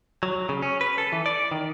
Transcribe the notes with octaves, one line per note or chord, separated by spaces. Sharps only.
F#3
C#3
C#4
B4
A4
E3
D5
D#3